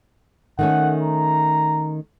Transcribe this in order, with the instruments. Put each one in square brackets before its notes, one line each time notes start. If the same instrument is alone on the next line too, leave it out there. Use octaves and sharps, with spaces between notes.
[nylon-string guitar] D#3 A3 C#4 [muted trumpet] F#5
[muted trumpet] A#5